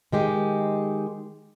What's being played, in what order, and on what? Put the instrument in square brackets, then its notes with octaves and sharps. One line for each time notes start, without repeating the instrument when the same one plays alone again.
[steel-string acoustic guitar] D#3 G#3 G4